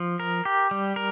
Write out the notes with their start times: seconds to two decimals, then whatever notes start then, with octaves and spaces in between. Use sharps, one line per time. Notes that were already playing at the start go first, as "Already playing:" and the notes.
Already playing: F3
0.20 A#4
0.45 G4
0.71 G3
0.96 A#4